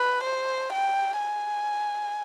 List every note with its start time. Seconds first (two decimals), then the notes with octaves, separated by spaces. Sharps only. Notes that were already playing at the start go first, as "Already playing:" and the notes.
Already playing: B4
0.23 C5
0.72 G5
1.20 G#5